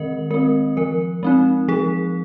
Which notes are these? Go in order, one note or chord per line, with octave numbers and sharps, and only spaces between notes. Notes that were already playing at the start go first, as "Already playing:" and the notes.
Already playing: D#3 G#3 C4 A#4 D#5
G#3 C4 A#4
F3 A#4
G#3 C4 D#4
F3 G#4